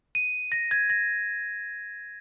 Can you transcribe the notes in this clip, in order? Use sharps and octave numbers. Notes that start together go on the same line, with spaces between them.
D#7
A#6
G#6
A#6